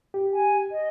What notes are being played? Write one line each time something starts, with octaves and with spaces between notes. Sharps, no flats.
G4
G#5
D#5